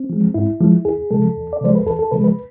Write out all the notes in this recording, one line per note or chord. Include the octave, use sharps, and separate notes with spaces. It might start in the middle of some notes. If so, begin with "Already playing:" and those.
Already playing: C4
F3 G#3
G#2 E4
F3 G#3
E2 G#4
C3 F3 G#3 A4
E2
D5
C3 F3 G#3 C5
B4
E2 A4
A4
C3 F3 G#3 B4
B4